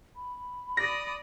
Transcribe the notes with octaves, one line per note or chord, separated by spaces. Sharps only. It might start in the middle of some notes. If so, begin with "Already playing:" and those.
B5
D5 D#6 A#6